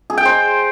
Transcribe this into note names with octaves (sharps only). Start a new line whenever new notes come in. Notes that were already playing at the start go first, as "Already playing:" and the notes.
G#4
G5
C5